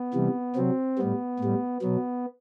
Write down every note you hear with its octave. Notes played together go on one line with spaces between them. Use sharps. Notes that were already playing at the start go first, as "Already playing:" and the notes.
Already playing: B3
C3 E3 G3
C3 F#3 C4
A2 G3 B3
A2 G3
B2 F#3 B3